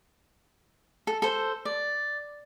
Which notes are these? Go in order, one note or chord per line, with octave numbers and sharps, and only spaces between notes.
A4
A4 C5
D5